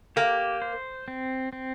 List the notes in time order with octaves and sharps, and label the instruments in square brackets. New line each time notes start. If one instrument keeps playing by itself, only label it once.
[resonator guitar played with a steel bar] A#3 [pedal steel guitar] G4
[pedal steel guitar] C5
C4
C4